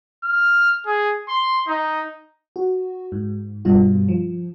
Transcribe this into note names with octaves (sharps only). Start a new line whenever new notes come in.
F6
G#4
C6
D#4
F#4
G#2
G2 B2 G3 F4
F3